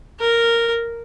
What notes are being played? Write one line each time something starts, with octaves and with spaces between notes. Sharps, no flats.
A#4